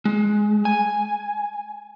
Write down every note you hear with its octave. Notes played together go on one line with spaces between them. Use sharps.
G#3
G#5